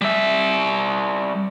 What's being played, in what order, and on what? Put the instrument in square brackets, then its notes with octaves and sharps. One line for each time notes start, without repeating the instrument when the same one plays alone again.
[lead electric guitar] G3 E5